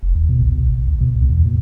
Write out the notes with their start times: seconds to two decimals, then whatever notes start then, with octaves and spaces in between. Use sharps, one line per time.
0.03 F1
0.15 D#2
0.29 B2
0.42 B1
0.58 C#2
0.70 A1
0.87 D2
1.01 B2
1.16 C2
1.30 E2
1.45 A#2